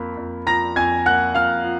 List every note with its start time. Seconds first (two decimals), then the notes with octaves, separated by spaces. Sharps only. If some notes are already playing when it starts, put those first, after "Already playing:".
Already playing: F2 A#3 B5
0.17 F2
0.47 F3 A#5 A#6
0.76 F2 G#5 G#6
1.06 A#3 F#5 F#6
1.35 F2 F5 F6
1.64 F3